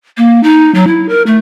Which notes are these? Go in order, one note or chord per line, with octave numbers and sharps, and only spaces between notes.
A#3
D#4
F#3
E4
A#4
A3